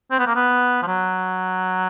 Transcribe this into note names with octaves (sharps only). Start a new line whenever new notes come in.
C4
B3
A#3
B3
F3
F#3